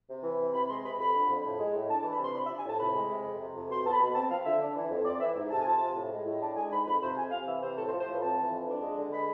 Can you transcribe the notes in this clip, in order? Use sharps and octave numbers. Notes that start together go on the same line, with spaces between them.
C3
E3
C3
C3 B5
G#3 C6
C3 B5
F2 B5
D3
F2
A2
G#3
A2
D4 A5
A5
E3
B5
C3 C6
D4 B5
E5
F3
G#5
A2 A5
C3 B5
G#3
C3
F2
C3
F2
B2 C6
B3 A5
B5
B2
C4 A5
F3 F5
D3 E5
D4
E3
F2
C4 D5
D5
E3 E5
G#2
C3 A5
G#5
F3 A5
C3
A2
G#3
A2
D4 A5
G#3 G#5
G#2 B5
F2 B5
C3 C5
F2 G#5
C3 F5
E3 E5
C3 C5
A2 A4
C5
F3
C5
A2 B4
F2 A5
E3
F2
D4
G#3
D3
G#3 B5